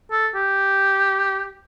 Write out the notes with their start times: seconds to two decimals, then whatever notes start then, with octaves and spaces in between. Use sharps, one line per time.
0.11 A4
0.35 G4